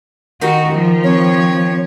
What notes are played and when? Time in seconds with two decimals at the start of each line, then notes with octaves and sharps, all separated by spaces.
0.41 D#3 D#4 F#4
0.72 F3
1.04 C4 C#5